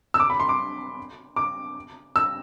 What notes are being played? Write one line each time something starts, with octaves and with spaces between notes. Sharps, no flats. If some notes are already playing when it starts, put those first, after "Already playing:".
E6
D6
B5
C6
D6
D6
E6